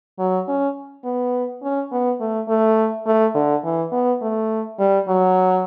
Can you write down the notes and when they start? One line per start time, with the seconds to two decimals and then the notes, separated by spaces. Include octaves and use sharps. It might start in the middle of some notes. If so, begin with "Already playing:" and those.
0.19 F#3
0.48 C#4
1.04 B3
1.63 C#4
1.91 B3
2.20 A3
2.48 A3
3.06 A3
3.35 D3
3.64 E3
3.92 B3
4.22 A3
4.79 G3
5.08 F#3